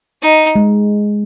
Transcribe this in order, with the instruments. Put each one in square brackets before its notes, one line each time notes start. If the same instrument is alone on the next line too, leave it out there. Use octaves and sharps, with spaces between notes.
[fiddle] D#4
[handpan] G#3